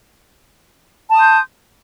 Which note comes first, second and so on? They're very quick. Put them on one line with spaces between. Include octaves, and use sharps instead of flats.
A5 D#6 C6 G6